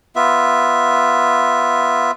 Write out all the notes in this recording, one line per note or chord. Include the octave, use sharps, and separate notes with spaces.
B3 F4 E5